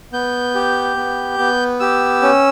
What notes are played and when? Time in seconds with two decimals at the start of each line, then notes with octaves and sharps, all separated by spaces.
0.13 B3 G6
0.55 G4
0.97 B3
1.39 B3
1.80 G4 E6
2.22 C#4